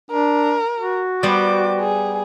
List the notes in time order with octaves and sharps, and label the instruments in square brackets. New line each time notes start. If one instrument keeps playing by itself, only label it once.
[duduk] D4 [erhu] A#4
[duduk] F#4
[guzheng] G3 B3 C5 [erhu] D6
[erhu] G#4